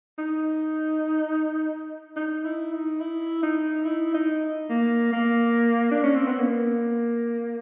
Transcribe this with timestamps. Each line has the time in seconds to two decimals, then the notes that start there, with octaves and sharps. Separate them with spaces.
0.18 D#4
2.16 D#4
2.44 E4
2.73 D#4
3.00 E4
3.43 D#4
3.85 E4
4.14 D#4
4.69 A#3
5.13 A#3
5.91 D4
6.03 C#4
6.15 C4
6.27 B3
6.39 A#3